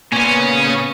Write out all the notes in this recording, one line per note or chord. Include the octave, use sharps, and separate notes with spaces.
A#2 C#3 B3 C#4 G#5